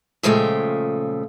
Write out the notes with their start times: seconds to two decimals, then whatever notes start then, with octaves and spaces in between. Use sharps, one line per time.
0.23 A#2 C#3 F3 G#3 A3 G5